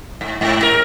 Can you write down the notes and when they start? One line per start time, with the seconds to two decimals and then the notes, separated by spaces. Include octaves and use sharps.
0.21 G#2
0.41 G#2
0.63 A#4